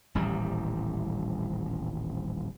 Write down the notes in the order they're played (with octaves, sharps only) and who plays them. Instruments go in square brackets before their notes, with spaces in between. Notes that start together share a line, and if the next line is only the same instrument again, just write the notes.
[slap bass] D#1 A1 A2 G3